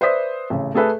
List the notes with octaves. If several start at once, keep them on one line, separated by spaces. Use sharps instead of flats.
B4 C5 D5 E5 D#6 B6
A1 C#3
A3 G#4 A4 B4 E5